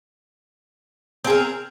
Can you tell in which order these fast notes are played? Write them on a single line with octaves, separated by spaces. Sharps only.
C4 G#4 A#4